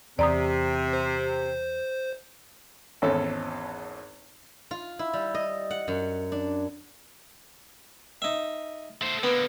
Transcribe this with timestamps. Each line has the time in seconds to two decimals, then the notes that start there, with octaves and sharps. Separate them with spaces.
0.19 E2 C3 D5 A#5 D#6
0.93 C5
3.02 G#1 E2 C#4 A4
4.71 F4
4.99 E4
5.13 G3
5.34 D#5
5.70 F#5
5.88 F#2
6.32 D4
8.22 D#4 E5
9.01 A3 C5
9.23 D3 A#3 B3